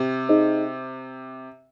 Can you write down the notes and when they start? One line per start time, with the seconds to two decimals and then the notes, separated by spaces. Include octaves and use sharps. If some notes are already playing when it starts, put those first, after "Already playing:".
Already playing: C3
0.29 D#4 G#4 C5 D#5